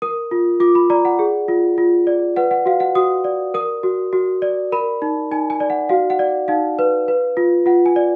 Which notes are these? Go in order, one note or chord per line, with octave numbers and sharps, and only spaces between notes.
A#4 D#6
F4
F4 D6
B5
D5 A#5
F#5
G#4
F4
F4
D5
B4 F#5
F#5
F#4 F5
F#5
F#4 D#6
D5
A#4 D#6
F#4
F#4
D5
A#4 B5
D#4
D#4 G#5
G#5
D5
F#5
F#4 F5
F#5
D5
D#4 F5
B4
B4
F4
F4 F#5
G#5
D5